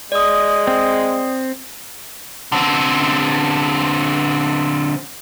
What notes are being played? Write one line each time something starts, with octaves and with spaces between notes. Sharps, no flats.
G#3 D5 D#6
C4
D3 C4